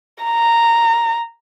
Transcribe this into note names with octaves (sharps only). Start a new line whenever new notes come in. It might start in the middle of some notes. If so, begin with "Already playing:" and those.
A#5